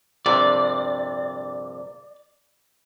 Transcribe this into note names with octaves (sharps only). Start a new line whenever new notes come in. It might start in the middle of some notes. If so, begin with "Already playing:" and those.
A#1 G2 C3 D5